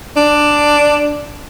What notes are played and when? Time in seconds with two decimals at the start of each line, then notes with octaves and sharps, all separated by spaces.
0.17 D4